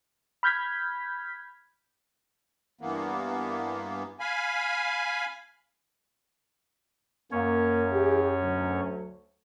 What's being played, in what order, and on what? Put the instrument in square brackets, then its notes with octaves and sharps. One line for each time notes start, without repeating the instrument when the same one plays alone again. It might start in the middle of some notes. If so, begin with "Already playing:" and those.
[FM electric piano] B5 F6 G6 G#6 B6
[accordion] G2 E3 A#3 B3
F5 G#5 B5
[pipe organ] F#2 C#4 C#5 [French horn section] A#3
[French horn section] E3 G4 G#4
D2 F#3